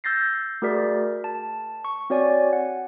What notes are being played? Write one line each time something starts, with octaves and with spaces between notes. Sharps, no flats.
E6 G6 A6 A#6 C7
A3 F#4 G#4 A#4 D5 B6
A5
C#6
C4 F#4 C#5 D5 G#5
F#5